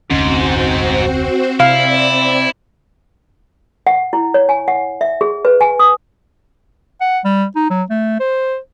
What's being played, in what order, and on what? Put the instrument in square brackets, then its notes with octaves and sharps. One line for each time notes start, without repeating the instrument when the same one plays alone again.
[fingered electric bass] F1 D2 C#4 [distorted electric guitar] G#2 [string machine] C4 F#4 C5
[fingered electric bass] C3 [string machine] C4 D5 [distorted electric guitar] E4 [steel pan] F5
[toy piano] F#5
E4
C#5
G#5
F#5
E5
G#4
B4
G#5
D#6
[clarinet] F#5
G3
D#4
F#3
A3
C5